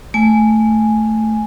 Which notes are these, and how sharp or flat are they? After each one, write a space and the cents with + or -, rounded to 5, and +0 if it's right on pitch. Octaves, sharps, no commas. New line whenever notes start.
A3 +0 G#5 +0